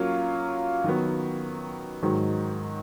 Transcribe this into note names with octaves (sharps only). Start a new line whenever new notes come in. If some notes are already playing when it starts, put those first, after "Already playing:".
Already playing: F#3 A#3 C#4 F4
D#3 F#3 B3
G#2 D#3 F#3